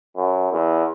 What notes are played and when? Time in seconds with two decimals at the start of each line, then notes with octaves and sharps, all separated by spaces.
0.16 F#2
0.52 E2